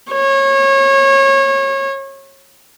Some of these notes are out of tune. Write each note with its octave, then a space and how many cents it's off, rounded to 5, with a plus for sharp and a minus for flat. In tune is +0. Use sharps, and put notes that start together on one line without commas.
C#5 -30